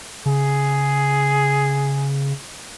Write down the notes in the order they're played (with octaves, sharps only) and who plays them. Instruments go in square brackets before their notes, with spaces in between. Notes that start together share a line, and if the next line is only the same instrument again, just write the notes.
[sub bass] C#3 [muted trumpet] G#4